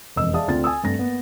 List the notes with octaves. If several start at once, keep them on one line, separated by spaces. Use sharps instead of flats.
E1 F2 D#5 E6
G#4 D5 E5 F5 A5 D#6
D2 C4 F4 D5 A6
G#5 D#6 E6
G2 A3 C4 A#6
A#3 B3